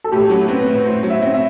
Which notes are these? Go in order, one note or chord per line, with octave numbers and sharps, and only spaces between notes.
A4
A2 G4
F#3
C4 B4
A2
A2 C5
F#3
E5
C4
E5